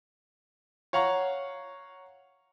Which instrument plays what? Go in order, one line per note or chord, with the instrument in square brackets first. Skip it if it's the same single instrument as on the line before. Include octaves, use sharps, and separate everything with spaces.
[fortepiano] C#5 F5 F#5 A#5 C#6